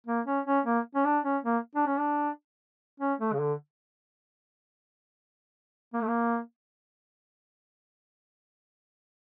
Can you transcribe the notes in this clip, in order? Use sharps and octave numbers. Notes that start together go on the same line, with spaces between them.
A#3
C#4
C#4
A#3
C#4
D4
C#4
A#3
D4
C#4
D4
C#4
A3
C#3
D3
A#3
A3
A#3